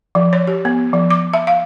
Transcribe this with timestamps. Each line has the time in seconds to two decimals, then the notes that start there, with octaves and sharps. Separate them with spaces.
0.15 F3
0.33 C#5
0.47 G4
0.65 B3
0.93 F3
1.10 D6
1.34 E5
1.47 F5